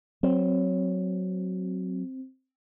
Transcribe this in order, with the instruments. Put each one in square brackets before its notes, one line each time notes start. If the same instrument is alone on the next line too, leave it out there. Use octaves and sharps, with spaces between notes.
[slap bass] F#3 [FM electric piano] C4